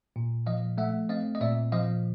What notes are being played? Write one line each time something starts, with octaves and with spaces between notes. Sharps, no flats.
A#2
F3 D#5 F5
A3 E5 F#5
C4 D#5 F5
D#5
A#2 D5 E5
F3 D#5 F5